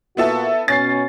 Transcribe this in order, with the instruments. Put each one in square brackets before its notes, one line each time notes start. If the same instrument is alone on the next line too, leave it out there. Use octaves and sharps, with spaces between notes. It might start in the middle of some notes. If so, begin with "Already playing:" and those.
[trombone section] A#2 A#3 F#4 [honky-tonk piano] B3 E4 A4
[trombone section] B2 C#4 [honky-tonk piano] A6 C7